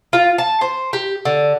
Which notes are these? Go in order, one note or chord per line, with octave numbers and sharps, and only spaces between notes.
F4
A5
C5
G4
D3